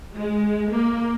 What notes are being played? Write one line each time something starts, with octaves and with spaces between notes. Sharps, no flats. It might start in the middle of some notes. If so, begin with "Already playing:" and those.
G#3
A#3